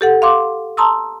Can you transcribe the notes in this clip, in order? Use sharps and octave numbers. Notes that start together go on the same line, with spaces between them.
G4 A4 F#5
F5 C6 D6
A5 A#5 C6 D#6 E6